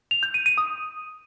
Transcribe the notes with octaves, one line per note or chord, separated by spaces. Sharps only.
F7
G6
D#7
D#7
D#6